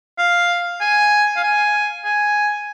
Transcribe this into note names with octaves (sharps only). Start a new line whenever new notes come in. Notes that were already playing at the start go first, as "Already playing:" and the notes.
F5
G#5
F5
G#5
G#5